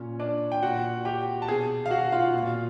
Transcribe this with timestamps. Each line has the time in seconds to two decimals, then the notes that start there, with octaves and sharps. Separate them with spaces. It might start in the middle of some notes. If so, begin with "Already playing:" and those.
Already playing: A#2 C#4 C#5
0.20 D4 D5
0.52 G5
0.62 A#2 F#4 F#5
1.05 G4 G5
1.42 A5
1.48 B2 G#4 G#5
1.86 F5
1.91 F#4 F#5
2.12 F4 F5
2.34 A#2